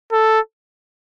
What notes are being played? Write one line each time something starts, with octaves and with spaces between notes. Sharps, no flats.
A4